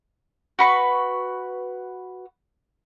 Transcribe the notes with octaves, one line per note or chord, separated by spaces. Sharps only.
F#4 B4 C#6